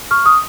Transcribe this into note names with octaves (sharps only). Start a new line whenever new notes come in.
C#6 F6
D#6